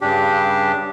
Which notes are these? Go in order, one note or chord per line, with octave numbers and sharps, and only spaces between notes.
G2 C#3 D4 G4